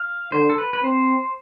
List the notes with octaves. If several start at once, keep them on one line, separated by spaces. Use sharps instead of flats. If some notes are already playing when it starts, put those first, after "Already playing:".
Already playing: F5
D3 C5
A4
B4
B4
C4 C5